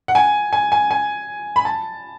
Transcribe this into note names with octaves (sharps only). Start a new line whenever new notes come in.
F#5
G#5
G#5
G#5
G#5
B5
A5